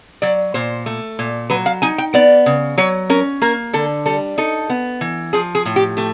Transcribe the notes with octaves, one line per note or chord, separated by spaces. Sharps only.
F#3 D5
A#2 C5
A3
A#2
F#3 B4
F5
D#4 G#5
G5
B3 D5
C#3
F#3 C#5
C#4 A#4
A#3 A#4
D3 A4
G3 A4
D#4 A4
B3
E3
F3 G#4
G#4
A2
G4
A3 G4